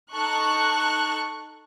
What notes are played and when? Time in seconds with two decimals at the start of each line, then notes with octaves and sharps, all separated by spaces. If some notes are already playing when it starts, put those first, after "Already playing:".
0.14 D#4 A4 C#6 F#6